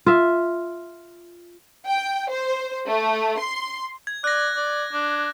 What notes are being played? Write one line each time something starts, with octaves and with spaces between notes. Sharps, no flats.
F4 E5
G5
C5
A3
C6
G#6
D5 F#6 A#6
D5
D4